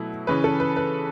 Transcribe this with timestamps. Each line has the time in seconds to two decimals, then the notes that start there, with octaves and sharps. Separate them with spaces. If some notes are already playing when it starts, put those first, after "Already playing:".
Already playing: B2 F#3 A3 E4
0.27 C#3 E3 C#4 B4
0.44 A4
0.60 B4
0.77 B4